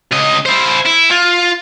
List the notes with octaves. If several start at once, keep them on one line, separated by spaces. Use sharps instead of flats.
C#2 D#5
E4 C5
E4
F4